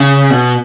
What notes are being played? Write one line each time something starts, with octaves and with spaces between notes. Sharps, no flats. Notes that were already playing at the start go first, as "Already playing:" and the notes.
Already playing: C#3
B2